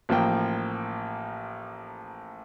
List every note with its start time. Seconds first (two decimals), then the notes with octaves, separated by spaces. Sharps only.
0.09 A1 F3 A#3 G5